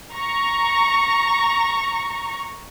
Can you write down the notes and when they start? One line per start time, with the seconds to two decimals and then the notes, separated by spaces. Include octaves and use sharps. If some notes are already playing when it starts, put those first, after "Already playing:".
0.13 A#5 C#6